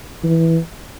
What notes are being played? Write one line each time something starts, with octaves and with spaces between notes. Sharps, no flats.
E3